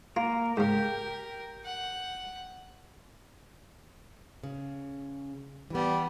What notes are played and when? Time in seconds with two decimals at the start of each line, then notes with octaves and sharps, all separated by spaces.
0.16 A#3 F4 A#4
0.57 G#2 C#3 G4 A#4
1.65 F#5
4.43 C#3
5.70 E3 G3 B3